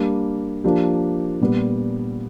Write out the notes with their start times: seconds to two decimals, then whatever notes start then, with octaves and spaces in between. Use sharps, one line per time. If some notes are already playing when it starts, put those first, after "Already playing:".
Already playing: G3 A#3 D4
0.64 F3 A#3 D4 G4
1.41 A#2 G3 B3